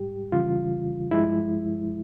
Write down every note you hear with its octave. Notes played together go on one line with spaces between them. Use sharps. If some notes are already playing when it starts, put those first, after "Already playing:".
Already playing: G#2 G3 G4
F2 C#3 E3 G3 F4
G2 F3 G#3 E4